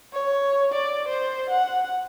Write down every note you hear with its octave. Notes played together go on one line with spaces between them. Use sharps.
C#5
D5
C5
F#5